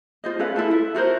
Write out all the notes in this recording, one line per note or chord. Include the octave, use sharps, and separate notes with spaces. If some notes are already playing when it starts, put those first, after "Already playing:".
F4 C5 D#5
C#4 A4 B4 F5
E4 F4 A4
E5
F4 F#4 A#4 C5